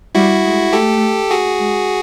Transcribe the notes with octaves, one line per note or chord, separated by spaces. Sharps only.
G3 E4 F#4
G#3
A3 G4 A4
F#4 G#4
G#3